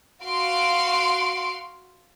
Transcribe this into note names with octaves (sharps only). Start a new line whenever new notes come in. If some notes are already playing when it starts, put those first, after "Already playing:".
F#4 F5 C6 D7